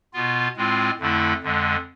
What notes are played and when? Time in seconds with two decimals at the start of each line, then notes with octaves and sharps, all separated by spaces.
0.14 B2 B3 F4
0.57 A2 G#3 C4 F4
0.99 F2 D3 A3 E4
1.43 F2 D3 G#3